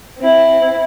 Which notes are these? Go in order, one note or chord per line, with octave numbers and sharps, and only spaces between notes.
C4 E4